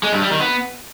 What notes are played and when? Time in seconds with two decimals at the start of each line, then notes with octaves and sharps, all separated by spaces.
0.03 G#3
0.13 G2
0.22 G3
0.31 D#3
0.41 B3